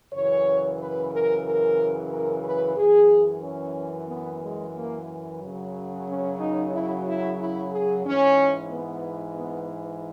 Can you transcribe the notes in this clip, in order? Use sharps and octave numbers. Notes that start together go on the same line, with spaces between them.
F#2 C#3 E3 C#5
B4
A#4
A#4
A#4
B4
F#2 E3 G#4
C#4
B3
G#3
A#3
F#2 C#3 F#3
C#4
D#4
E4
E4
E4
G#4
G#2 E3 C#4
B3
B3